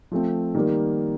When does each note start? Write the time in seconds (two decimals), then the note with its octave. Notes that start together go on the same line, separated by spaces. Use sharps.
0.12 F3 A3 C4
0.55 D#3 G3 A#3